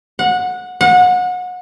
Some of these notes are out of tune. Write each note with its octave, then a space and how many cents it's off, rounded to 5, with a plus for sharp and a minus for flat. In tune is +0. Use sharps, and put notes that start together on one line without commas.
F#5 -20
F#5 -30